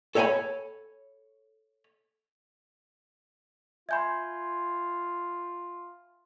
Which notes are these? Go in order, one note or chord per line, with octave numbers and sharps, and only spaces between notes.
A4 C#5 E5 G5 G#5 B5
F4 E5 G#5 B5 C6 G6 G#6